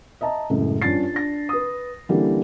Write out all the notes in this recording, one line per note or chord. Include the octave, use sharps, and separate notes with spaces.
D#5 E5 A5 A#5
C#2 F#2 A2
G2 C#4 D4 F4 A6 C7
D4 A#6
B4 D#6
D3 E3 G3 A#3 C#4 G4